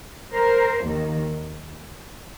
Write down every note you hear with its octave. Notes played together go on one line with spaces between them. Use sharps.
A#4 C5
D#2 D#3